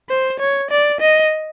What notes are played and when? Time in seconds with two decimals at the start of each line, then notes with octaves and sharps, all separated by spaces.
0.09 C5
0.40 C#5
0.70 D5
1.01 D#5